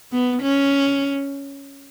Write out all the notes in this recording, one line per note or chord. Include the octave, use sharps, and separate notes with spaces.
B3
C#4